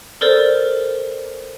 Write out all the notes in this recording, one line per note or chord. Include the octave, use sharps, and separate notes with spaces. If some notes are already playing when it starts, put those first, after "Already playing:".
A4 A#4 C5 D5